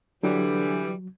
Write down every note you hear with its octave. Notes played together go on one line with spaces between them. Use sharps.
D3 E3 F#3 G3